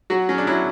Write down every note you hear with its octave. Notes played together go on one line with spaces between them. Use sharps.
F#3 F#4
F#3 C#4
D4
F#3 E4